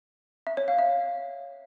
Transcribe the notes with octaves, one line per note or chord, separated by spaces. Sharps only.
E5
C#5
F5
E5